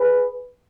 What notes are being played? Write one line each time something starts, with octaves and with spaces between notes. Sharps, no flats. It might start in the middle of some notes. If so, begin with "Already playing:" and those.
Already playing: G#4 B4